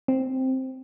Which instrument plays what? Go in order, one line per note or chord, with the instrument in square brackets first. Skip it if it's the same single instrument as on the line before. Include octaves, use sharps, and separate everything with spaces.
[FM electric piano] C4